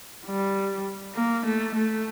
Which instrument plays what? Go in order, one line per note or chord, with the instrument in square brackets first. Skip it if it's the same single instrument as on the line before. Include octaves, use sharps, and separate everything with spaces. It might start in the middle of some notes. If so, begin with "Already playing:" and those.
[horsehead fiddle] G3
A#3
A3
A3